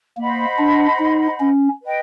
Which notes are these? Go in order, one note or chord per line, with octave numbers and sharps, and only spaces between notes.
A#3 C5 D#5 F#5 B5
D4
D#4
C#4
B4 D#5 G5